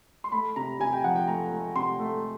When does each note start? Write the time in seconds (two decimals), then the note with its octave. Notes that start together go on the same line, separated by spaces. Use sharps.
0.24 C6
0.32 A3 B5
0.56 C3 A#5
0.80 C3 G#5
0.93 G5
1.04 F3 F#5
1.16 G5
1.28 A3 A#5
1.51 A3
1.76 C3 C6
2.00 A3